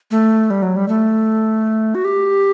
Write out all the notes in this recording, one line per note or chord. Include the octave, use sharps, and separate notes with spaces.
A3
G3
F#3
G3
A3
F#4
G4